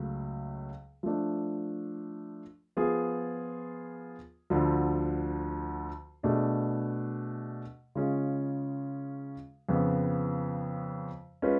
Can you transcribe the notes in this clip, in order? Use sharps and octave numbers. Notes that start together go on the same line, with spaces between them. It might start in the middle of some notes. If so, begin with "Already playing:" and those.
Already playing: C#2 C#3 F#3 A3
F3 A3 D4
F3 B3 F4 G#4
D2 D3 F3
B2 A3 D4 G#4
C#3 G#3 C#4 F4 G#4
F2 C#3 F3 B3
G#3 C#4 F4 B4